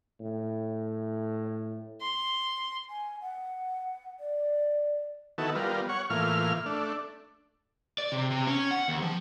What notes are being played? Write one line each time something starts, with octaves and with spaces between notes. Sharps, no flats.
A2
C6
G#5
F#5
D5
D#3 B3 E4 F#4 A4
G3 B3 F4 A#4
C#5 F#5 C#6
A2 E3 A#3 F4 F6
A3 D4
D5
C3
C3
C#4
F#5
D#2
F3